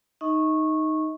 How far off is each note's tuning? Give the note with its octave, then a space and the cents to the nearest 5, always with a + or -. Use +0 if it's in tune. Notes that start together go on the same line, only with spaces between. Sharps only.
D#4 +0 D#5 +35 C#6 -15